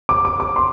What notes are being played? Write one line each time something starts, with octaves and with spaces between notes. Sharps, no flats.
D6
D6
D6
C6